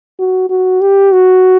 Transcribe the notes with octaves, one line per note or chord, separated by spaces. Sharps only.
F#4
F#4
G4
F#4